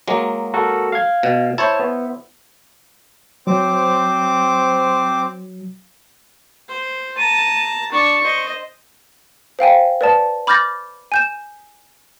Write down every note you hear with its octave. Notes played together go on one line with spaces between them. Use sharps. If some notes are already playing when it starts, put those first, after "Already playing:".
F#3 G#3 A#3
F#4 A4 A#4
F5 G#6
B2
E4 C5 C#5 A5
B3
F#3 C4 C5 D6
C5
A5 A#5 D#7
D4 A5 C#6
C5 D#5
C5 F5 G5 G#5
B4 D5 A5
B5 D6 F6 G6 A6 A#6
G#5 G6 E7